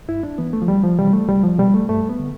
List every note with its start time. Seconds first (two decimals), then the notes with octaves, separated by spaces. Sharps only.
0.08 G2 E4
0.23 D4
0.38 E3 B3
0.53 A3
0.62 F3
0.68 C2 G3
0.83 F3
0.98 C3 E3 G3
1.13 A3
1.29 C2 G3
1.43 F3
1.58 B2 G3
1.74 A3
1.89 G2 A3
2.09 B3
2.19 D3